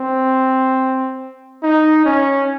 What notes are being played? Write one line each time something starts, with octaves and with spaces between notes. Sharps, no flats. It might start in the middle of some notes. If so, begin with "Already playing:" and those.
Already playing: C4
D#4
C#4